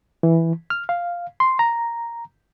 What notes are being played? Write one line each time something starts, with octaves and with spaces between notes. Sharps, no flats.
E3
F6
F5
C6
A#5